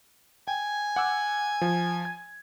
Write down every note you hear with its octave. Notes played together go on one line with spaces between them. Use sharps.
G5 G#5
F#5 D6 E6
F3
G#6